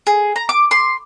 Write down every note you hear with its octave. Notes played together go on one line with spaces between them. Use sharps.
G#4
A#5
D6
C6